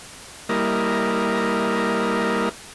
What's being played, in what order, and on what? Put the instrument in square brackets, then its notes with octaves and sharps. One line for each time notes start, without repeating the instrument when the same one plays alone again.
[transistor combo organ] G3 A#3 E4 A#4 D#5